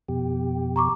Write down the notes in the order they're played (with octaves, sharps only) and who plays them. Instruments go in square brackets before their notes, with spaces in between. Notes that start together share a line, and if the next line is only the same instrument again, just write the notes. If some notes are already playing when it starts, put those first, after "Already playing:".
[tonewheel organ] F2 B2 G4
[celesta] A#5 C#6 D6